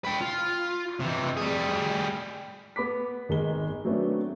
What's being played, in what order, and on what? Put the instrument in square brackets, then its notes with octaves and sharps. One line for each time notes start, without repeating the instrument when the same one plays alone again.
[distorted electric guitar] B4 G5
F4
C3 E3
G3 G#4
[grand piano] B3 B5 D6 B6
G#1 D#3 G#3 A#4 G7
F#3 A3 B3 C4 D4